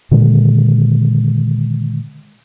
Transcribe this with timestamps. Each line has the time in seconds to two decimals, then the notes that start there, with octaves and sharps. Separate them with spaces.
0.11 A#2 D3 D#3 G#3